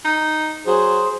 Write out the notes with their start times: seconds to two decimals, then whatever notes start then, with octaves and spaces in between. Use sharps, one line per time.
0.05 D#4
0.67 F#3 G#4 C5